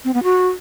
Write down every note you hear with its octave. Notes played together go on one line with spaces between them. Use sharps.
C4
B3
F#4